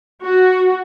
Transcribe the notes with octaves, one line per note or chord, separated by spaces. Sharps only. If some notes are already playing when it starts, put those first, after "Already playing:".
F#4